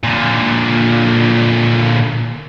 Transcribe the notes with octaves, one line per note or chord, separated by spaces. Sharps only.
A#2 D3